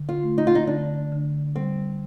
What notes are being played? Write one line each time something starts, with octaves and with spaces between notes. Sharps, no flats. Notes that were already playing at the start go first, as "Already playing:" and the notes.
Already playing: D3
F4
A3
D#4
F4
D#4
D3 D4
D3
G3 C4